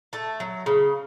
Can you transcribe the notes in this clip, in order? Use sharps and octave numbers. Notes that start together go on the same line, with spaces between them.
A3 A5
F#3
C#3